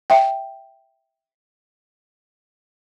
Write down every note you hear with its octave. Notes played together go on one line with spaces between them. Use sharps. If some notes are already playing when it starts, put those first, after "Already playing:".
E5 G5